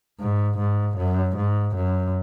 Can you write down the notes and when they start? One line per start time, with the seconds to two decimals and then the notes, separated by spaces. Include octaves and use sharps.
0.19 G#2
0.58 G#2
0.97 F#2
1.36 G#2
1.75 F#2